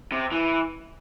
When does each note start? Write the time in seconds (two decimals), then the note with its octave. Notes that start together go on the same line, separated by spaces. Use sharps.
0.12 C3
0.32 E3